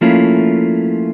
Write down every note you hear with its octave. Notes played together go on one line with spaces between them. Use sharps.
F3 A3 A#3 C#4 E4 F4